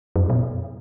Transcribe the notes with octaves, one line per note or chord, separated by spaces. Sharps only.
F#2
B2